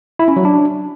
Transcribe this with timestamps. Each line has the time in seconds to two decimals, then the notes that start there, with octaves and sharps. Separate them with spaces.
0.19 E4
0.28 C#4
0.36 F#3
0.45 D4